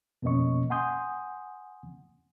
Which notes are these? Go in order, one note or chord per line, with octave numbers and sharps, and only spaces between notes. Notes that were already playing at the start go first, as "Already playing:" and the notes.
F2 B2 A#3 C#4 D#5 C#6
F#5 G#5 C6 D#6 G6